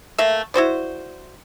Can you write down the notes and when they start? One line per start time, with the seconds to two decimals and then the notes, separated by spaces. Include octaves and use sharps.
0.18 A3 A#3 E5
0.54 E4 F#4 C5 D5